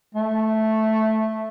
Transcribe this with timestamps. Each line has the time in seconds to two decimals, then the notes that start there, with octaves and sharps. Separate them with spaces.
0.14 A3